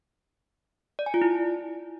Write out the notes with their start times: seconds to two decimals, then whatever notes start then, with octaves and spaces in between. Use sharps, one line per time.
0.99 D5
1.06 G#5
1.14 F4
1.21 E4